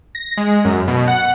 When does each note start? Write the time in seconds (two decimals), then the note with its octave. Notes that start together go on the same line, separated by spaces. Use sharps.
0.15 A#6
0.37 G#3
0.65 F#2
0.88 B2
1.08 F#5